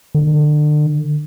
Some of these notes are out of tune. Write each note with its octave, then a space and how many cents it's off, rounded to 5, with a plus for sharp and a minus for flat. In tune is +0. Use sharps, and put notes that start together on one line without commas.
D3 +35